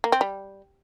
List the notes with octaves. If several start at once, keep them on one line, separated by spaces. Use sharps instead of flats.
A#3
C4
G3